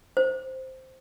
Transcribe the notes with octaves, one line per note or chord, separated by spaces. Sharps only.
C5